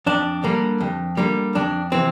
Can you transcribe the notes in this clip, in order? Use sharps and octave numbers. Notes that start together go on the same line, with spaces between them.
F2 D4
D3 G3 A#3
F2
D3 G3 A#3
F2 D4
C3 E3 C4